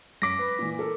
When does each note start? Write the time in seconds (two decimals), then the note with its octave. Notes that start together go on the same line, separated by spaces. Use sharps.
0.22 F#2 D6 A#6 B6
0.39 B4
0.59 A#2 E3
0.79 A4 A#4